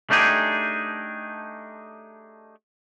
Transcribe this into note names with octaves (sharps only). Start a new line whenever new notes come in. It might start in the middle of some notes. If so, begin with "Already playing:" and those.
A3 D4 D#4 G4 G#4